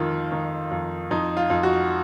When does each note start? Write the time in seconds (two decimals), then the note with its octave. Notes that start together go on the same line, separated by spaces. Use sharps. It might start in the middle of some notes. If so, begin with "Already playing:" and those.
Already playing: F2 D#3 F4
0.32 D#3
0.71 F2
1.11 F2 D#4
1.37 F4
1.50 F2
1.63 F#4